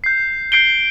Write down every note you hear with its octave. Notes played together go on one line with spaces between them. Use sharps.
G6 C7
G6 C7 D7 G7